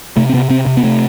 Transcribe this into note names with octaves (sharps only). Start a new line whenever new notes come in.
C3 A3
C4
C3 B3
C3 C4
C3
B3
C3 A3